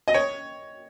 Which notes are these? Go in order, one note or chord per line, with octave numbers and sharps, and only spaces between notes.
D#5
C#5